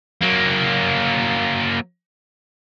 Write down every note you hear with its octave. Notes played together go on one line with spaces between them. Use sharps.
F#3 A#3